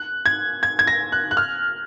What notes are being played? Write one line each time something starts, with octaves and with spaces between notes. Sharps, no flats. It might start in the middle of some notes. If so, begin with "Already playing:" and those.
Already playing: F#6
G#6
G#6
G#6
A#6
F#6
F#6
F6